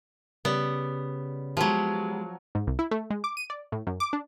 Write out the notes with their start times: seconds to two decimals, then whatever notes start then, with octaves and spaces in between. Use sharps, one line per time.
0.45 C#3 G3 B3 D5
1.57 F3 F#3 G#3 B3 G4
2.55 G#2
2.67 C2
2.79 E4
2.91 A3
3.10 G#3
3.24 D6
3.37 D#7
3.50 D5
3.72 A2
3.87 F#2
4.00 D6
4.13 D4